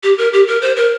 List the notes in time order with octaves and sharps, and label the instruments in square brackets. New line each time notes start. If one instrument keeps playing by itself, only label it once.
[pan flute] G4
A#4
G4
A#4
C5
A#4